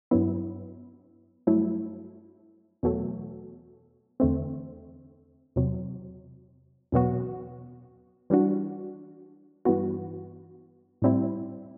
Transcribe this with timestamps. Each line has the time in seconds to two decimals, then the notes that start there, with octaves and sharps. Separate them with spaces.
0.11 G2 F#3 B3 E4
1.47 G2 F#3 A3 E4
2.83 E2 B2 F#3 A3
4.20 E2 D3 A3 C4
5.56 E2 C3 F#3
6.92 E2 B2 F#3 B3 F#4
8.30 E3 G3 D4 F#4
9.65 G2 E3 B3 F#4
11.02 A2 G3 C4 E4